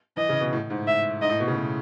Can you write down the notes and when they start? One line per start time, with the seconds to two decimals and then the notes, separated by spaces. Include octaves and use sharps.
0.17 E3 D#5
0.29 C#3
0.41 B2
0.53 A2
0.70 G#2
0.88 E5
1.22 G#2 D#5
1.31 A2
1.40 B2
1.48 C#3
1.56 B2